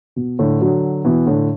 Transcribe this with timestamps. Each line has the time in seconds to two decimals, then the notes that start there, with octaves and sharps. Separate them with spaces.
0.16 B2
0.39 A2 D3
0.61 D3 F#3
1.05 B2 E3
1.27 A2 D3